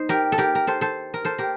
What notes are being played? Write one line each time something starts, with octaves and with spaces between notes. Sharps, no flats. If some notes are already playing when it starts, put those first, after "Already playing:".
Already playing: D#4 C5
G4 A#4
A4
G4 A#4
A#4
A4 C5
A4 C5
A#4
A4 C5
G4 A#4